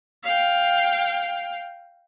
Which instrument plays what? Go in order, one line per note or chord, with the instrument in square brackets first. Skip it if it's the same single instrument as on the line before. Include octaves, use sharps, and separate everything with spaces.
[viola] F5 G5